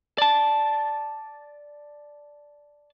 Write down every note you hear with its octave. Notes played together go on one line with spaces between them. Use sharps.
D5 A5